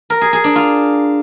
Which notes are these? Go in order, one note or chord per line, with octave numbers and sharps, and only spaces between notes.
A#4
G#4
G#4
D4
F4